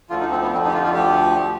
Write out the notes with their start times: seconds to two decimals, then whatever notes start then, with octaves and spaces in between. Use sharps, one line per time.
0.10 D2 D3 F3 F4
0.20 D#4
0.31 C4
0.42 B3
0.53 F2 D3 F3 C4
0.63 D#4
0.68 G4
0.74 F4
0.84 F4
0.94 D2 D3 F3 G4
1.39 F3